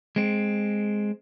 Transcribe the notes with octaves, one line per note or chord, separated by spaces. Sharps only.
G#3 C4